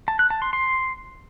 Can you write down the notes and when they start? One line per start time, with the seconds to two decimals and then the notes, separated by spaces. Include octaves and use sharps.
0.08 A5
0.19 F#6
0.30 A5
0.42 C6
0.53 C6